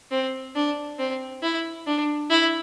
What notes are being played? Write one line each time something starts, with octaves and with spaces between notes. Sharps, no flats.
C4
D4
C4
E4
D4
E4